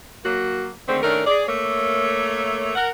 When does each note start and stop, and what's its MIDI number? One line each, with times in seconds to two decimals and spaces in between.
0.24 0.69 54
0.24 0.69 58
0.24 0.69 66
0.88 1.02 50
0.88 1.02 51
0.88 1.02 56
0.88 1.02 57
0.88 1.02 60
1.03 1.23 51
1.03 1.23 57
1.03 1.23 61
1.03 1.23 62
1.03 1.23 69
1.03 1.23 70
1.27 1.44 68
1.27 1.44 74
1.47 2.72 57
1.47 2.72 58
1.47 2.72 73
2.75 2.89 70
2.75 2.89 78